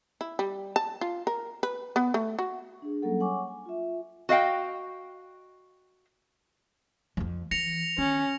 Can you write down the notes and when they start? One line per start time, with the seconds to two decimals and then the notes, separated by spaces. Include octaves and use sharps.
0.21 E4
0.39 G3
0.76 A5
1.01 F4
1.27 A#4
1.63 B4
1.96 B3
2.14 A3
2.39 F#4
2.82 D4 G#4
3.02 F#3 G3 A#3 C#4 A4 F#5
3.20 C#5 F#5 G#5 C#6 D6
3.48 G#5
3.66 F4 E5
4.29 F#4 D#5 F5 G5
7.17 F2 F3
7.51 E3 A#6 C#7 F7
7.98 D#3 C#4